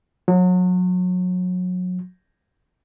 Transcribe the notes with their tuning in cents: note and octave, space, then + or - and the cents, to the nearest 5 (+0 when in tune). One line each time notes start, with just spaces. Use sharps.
F#3 -30